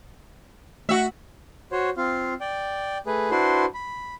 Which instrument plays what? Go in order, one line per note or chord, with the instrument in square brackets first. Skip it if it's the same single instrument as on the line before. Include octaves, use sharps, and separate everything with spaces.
[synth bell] A3 F#5 [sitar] F#4 E5
[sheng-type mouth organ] F#4 C5 C#5
C4 F4 F5
D5 G5
A3 G#4 B4
D4 E4 F#4 B4 C5 C6
B5